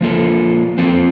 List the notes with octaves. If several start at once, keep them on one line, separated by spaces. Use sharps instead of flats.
F3 A#3 F4 A4
F3 C4 F4 A4